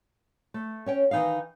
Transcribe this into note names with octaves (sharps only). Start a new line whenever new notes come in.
A3
C#4 C#5 G5
D#3 E3 D#4 D#5 F5